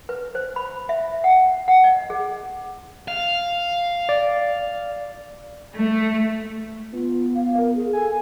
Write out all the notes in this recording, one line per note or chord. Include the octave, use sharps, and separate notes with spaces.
B4
C5
B5
E5
F#5
F#5
D#5
G#4
F5
D5
A3
B3 F4
F5
A#4
G#4
A4 G#5